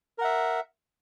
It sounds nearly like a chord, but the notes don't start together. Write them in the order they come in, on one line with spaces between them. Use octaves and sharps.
A#4 F#5 E5